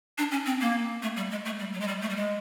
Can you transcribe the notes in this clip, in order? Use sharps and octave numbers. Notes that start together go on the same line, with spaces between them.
D4
C#4
C4
A#3
A3
G3
G#3
A3
G3
F#3
G#3
G3
A3
G3
G#3